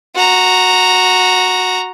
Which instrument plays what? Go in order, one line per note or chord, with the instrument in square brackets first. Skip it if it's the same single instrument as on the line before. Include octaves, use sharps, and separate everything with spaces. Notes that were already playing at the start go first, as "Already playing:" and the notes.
[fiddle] F#4 A#5